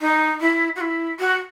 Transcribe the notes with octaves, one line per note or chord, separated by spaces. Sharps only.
D#4
E4
F#4
E4
F#4